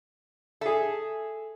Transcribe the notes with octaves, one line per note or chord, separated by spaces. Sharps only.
G#4 A4 E5